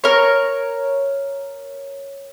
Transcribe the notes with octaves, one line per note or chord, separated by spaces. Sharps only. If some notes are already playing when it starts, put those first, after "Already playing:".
A#4 C#5